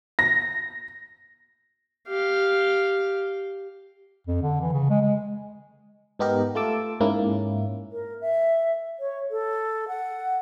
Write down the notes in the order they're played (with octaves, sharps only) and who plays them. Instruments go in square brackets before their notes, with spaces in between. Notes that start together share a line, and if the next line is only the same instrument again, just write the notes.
[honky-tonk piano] A#6
[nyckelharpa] G4 F5
[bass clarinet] F2
D3
E3
C#3
G#3
G#3
[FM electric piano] G#2 B3 D#4 G4 A#4
A3 F4 A4 A5 D6 E6
G#2 A#3 C#4 E4
[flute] A#4
E5
C#5
A4
F#5